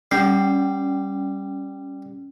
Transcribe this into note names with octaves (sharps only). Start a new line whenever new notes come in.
G3 C#4 C7